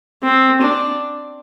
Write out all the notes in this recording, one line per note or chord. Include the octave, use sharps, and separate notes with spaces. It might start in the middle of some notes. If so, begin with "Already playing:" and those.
C4
D4